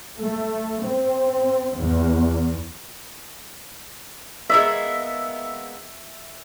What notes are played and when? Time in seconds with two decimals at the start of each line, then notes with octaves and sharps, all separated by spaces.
0.19 A3
0.86 C4
1.75 E2
4.50 G#3 A#3 B3 E5